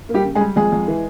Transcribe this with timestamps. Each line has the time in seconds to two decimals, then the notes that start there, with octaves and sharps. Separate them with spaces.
0.09 A#3
0.14 G3 G4
0.25 C#3
0.35 G#3 G#4
0.41 G3
0.56 F2 G#3 G#4
0.72 F2
0.88 E3